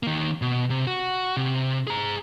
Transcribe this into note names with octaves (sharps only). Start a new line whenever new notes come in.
D#3 A#3
B2
C3
F#4
C3
G#4 A#5